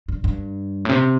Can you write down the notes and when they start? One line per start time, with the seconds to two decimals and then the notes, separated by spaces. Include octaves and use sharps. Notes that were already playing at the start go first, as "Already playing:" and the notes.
0.08 G2
0.24 G2
0.85 A2
0.89 C3